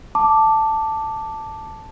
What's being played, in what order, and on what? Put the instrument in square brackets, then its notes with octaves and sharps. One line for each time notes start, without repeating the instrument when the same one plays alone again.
[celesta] A5 D6